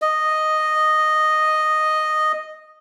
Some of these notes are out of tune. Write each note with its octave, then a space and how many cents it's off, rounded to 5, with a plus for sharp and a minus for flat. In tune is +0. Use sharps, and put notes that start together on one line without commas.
D#5 -5